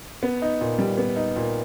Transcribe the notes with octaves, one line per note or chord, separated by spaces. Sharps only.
B3
D#4
A#2
G3
B3
D#4
A#2